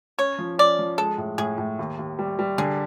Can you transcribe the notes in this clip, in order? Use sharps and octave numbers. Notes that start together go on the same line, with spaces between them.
C#4 C#5
F3
C#4 D5
F3
G#3 A4
A2
A2 G#4
A2
D#2
D#2
G3
G3
D3 G#4